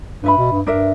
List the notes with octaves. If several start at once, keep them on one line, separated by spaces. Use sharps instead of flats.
G2 B4 E5 B5
B2
G2
G2 D4 A#4 E5